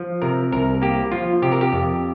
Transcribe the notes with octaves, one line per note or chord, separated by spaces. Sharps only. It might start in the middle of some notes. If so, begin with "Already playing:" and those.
Already playing: F3
C3 A#4
C2 A#4
A#3 G4
F3 F4
C3 G4
A#4
G4
F2